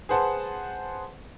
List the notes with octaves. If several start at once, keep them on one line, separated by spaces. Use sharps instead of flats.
G#4 B4 C5 F#5 A5